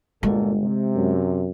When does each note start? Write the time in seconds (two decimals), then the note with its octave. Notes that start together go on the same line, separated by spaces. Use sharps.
0.23 G1 A#2 G#3 F#4 A4
0.61 C3
0.96 F#2